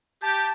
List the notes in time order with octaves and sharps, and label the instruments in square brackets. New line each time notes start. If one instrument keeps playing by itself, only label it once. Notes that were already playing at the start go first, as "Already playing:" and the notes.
[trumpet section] G4 [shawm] A5